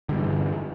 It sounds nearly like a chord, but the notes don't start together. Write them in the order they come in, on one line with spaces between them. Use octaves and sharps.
D3 G3 G2 E3